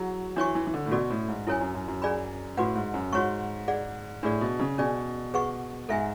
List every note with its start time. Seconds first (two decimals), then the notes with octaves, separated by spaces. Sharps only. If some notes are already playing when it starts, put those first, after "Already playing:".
Already playing: F#3 E4 G#4 F#5
0.36 E3 D4 F#4 C#5 G#5 C#6
0.55 E3
0.67 E3
0.74 D3
0.86 A2
0.91 B2 C#4 F#4 A4 D5
1.10 A2
1.28 G#2
1.47 F#2 E4 A4 C#5 G#5
1.61 F#2
1.75 F#2
1.88 F#2
2.02 C#4 G#4 D5 G#5 B5
2.57 A2 F#4 B4 F#5
2.75 G#2
2.94 F#2
3.13 G#2 F#4 C#5 F#5 C#6
3.68 G#4 D5 F#5
4.23 A2 D4 G#4 D5
4.41 B2
4.60 C#3
4.78 B2 C#4 G#4 D5 G#5
5.34 G#4 B4 F#5 C#6
5.89 G#2 A4 E5 G#5